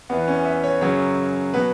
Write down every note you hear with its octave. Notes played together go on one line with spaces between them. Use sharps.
E2 E3 B3
C#4
E5
C#5
F#2 C#3 F#3 C#5
B2 F#3 B4